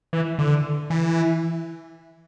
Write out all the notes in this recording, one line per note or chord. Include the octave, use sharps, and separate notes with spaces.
E3
D3
E3